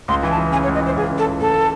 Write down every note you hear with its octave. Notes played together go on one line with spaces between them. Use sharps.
C#2 C6
E3 G#5
A5
E3
C#3 G#5
C#5
C#2
D#5
E3 C5
C#2 G#4
C#3
A4
C#2
C#2 A4
C#3